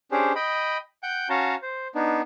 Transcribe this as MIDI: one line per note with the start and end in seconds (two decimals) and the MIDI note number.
0.12 0.33 61
0.12 0.33 62
0.12 0.33 67
0.12 0.33 68
0.12 0.33 72
0.36 0.77 75
0.36 0.77 79
0.36 0.77 83
1.03 1.28 78
1.03 1.28 79
1.03 1.28 91
1.30 1.55 61
1.30 1.55 66
1.30 1.55 73
1.30 1.55 77
1.30 1.55 81
1.30 1.55 82
1.62 1.88 72
1.95 2.21 59
1.95 2.21 62
1.95 2.21 63